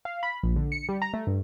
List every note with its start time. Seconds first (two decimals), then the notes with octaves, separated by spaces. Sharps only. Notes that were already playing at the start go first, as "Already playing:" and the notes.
0.05 F5
0.23 B5
0.43 A#1
0.56 D3
0.72 C#7
0.89 G3
1.02 A#5
1.13 A3
1.27 G2